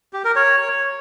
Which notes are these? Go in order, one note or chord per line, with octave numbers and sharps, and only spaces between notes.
G4
A#4
C#5